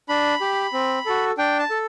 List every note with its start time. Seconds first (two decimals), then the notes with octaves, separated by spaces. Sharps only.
0.09 D4 B5
0.41 G4
0.73 C4
1.06 F#4 A4
1.38 D4 G5
1.59 A5
1.70 A4